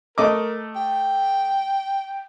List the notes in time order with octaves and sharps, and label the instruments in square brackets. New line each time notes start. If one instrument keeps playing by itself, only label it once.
[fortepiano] A3 D#5 D6 [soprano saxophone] A#4
[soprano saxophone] G5